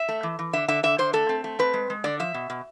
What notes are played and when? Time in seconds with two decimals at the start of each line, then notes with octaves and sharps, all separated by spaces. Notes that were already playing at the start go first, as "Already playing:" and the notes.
Already playing: E5
0.09 A3
0.23 E3
0.39 E3
0.53 D3 E5
0.68 D3 E5
0.83 D3 E5
0.98 D3 C5
1.13 A3 A4
1.29 C4
1.44 A3
1.59 C4 B4
1.74 G#3
1.90 G#3
2.04 D3 D5
2.20 F3 E5
2.34 B2
2.50 B2